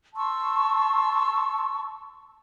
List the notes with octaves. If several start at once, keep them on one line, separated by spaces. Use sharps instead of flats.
A5 C6 C#6 E6